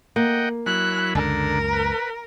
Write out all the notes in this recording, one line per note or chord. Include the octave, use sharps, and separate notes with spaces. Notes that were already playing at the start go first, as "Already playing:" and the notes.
A#3 D#5 F#5 G5
F#3 E4 B5 F#6
C#2 F#2 D3 A#4
B4